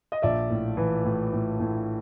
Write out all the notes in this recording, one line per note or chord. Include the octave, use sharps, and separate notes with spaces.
D#5
A#1 D5 E5
A2
E3
A2
A2
A2